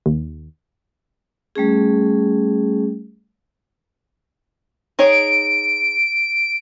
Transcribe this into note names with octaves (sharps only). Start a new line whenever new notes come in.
D#2
G3 A3 C#4 G#4
D#4 G#4 C#5 D7